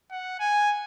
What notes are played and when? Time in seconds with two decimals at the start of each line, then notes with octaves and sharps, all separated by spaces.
0.11 F#5
0.40 G#5